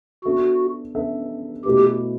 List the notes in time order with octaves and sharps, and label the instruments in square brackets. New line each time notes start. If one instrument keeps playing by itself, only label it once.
[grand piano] B3 D4 A4 E5 [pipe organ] F#4
[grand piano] B3 D4 A4 E5
[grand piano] B2 A3 E4 B4 [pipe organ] G4